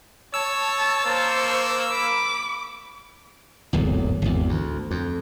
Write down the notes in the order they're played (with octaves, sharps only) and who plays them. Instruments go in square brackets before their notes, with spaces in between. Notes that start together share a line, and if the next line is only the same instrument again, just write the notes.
[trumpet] C#5 [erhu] A5 [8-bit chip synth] E6
[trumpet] A#3 [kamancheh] C5 C#6
[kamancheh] B5 [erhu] D6
[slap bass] D1 G#1 E2
G#1 E2
D2
F2